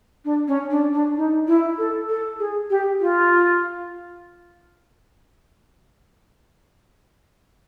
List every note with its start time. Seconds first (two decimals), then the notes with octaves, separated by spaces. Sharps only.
0.25 D4
0.48 C#4
0.70 D4
0.93 D4
1.17 D#4
1.47 E4
1.78 A4
2.09 A4
2.39 G#4
2.70 G4
3.00 F4